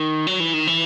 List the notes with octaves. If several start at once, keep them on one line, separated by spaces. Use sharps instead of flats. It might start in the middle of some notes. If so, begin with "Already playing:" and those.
Already playing: D#3
F#3
E3
D#3
E3